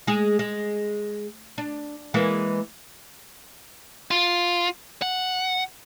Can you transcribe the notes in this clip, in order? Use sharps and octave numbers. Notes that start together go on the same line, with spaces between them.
G#3 G#4
G#3
D4
E3 G#3 A#3
F4
F#5